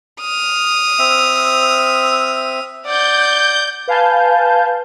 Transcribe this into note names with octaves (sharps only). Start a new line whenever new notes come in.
D#6 F6
C4 E5
D5 F#5 G6
B4 F5 G#5 A5 G6